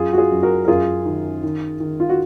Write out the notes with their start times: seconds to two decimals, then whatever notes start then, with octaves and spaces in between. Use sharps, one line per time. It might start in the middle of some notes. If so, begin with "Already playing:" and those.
Already playing: F#2 F4 G#4
0.13 F#4
0.18 F4 G#4
0.31 F#2
0.43 F#4 A#4
0.64 A#4
0.68 F#2 F4 G#4
1.05 D#3
1.43 D#3
1.80 D#3
2.00 F4
2.09 F#4